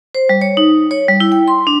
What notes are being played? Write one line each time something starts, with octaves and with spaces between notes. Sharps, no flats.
C5
G3
C#5
D#4
C#5
G3
E4
G5
C6
D4